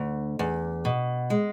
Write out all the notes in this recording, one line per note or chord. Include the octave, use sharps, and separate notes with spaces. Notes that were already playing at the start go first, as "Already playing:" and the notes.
Already playing: D2
E2
B2
G#3